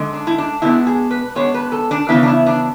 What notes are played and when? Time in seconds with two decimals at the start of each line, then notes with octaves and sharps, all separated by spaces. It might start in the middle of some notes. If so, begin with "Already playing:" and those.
Already playing: D3 G#3
0.13 D4
0.27 E4
0.38 D4
0.62 B2 G#3 B3 D4 E4
0.87 G#4
1.11 B4
1.35 B2 G#3 B3 D4 C#5
1.54 B4
1.72 A4
1.91 D4
2.09 C#3 E3 B3 D4 E4
2.23 D4
2.28 E4
2.46 D4